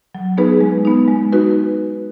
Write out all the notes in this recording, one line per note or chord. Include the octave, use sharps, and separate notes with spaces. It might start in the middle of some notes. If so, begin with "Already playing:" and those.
F#3
B3 D#4 G#4 B4
G#3
B3 D#4
G#3
D#4 F#4 B4